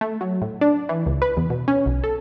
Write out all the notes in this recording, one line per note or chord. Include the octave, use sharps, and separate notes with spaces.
A3
F#3
A2
D4
E3
C#2
B4
E2
B2
C#4
B1
A4